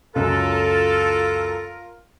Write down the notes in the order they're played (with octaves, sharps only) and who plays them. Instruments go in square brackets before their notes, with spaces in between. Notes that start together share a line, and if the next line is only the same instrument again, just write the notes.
[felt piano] C#2 F#2 [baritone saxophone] F4 [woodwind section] A4 [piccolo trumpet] A#4